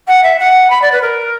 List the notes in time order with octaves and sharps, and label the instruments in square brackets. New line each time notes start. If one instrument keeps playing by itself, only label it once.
[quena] F#5
E5
F#5
B5
D5
B4
A#4